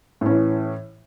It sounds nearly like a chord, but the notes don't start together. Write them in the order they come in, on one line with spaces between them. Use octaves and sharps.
A2 C#4 E3